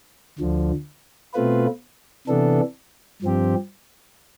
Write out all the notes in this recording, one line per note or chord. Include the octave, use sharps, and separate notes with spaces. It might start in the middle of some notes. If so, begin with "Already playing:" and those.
D2 D3 F3
B2 A3 C4 F4 B4
C3 E3 B3 D4 A4
G2 F3 C4 G4